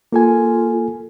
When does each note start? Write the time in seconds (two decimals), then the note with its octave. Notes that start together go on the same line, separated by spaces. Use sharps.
0.12 A#3 F4 A4 G#5